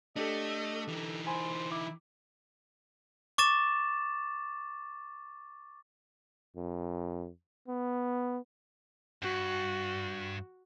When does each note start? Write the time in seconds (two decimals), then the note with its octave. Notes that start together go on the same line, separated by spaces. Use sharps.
0.16 A3 D4 G4 A4 D#5
0.88 E3 D#4
1.27 C5 G#5 B5
1.72 E4 D6
3.38 C#6 D6 A6 E7
6.56 F2
7.68 B3
9.22 G2 F#4